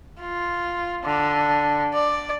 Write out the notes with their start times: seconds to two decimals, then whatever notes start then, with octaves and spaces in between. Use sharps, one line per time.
0.21 F4
1.03 D3
1.94 D5